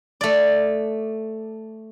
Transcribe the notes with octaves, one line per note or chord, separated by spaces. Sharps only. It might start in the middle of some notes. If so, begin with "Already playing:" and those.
A3 D5